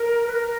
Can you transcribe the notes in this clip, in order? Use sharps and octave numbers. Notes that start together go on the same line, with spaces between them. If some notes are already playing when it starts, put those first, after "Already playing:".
Already playing: A#4
B4
A#4